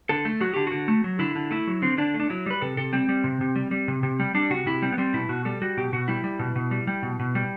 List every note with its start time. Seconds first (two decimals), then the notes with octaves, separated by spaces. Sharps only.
0.09 D3 A4
0.25 A3
0.41 F#3 F#4
0.54 D3 G4
0.67 D3 F#4
0.88 A3
1.04 F#3
1.19 D3 E4
1.35 D3
1.51 A3 E4
1.67 F#3
1.82 D3 C4
1.98 D3 D4
2.14 A3
2.20 D4
2.29 F#3 E4
2.46 G3 B4
2.61 C3 A4
2.77 C3 A4
2.93 G3 C4
3.09 G3
3.24 C3
3.41 C3
3.56 G3
3.71 G3
3.88 C3
4.03 C3
4.20 G3
4.35 G3 D4
4.50 C3 F#4
4.66 C3 E4
4.82 G3 C4
4.92 B3
4.98 G3 C4
5.14 B2 E4
5.29 B2 F#4
5.45 G3 A4
5.62 G3 F#4
5.77 B2 G4
5.93 B2 F#4
6.08 G3 E4
6.24 G3
6.39 B2
6.56 B2
6.71 G3
6.87 G3
7.03 B2
7.19 B2
7.35 G3